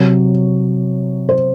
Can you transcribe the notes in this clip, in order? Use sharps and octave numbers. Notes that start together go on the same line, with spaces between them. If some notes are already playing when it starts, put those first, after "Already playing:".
Already playing: C3 F#3 C#5
C5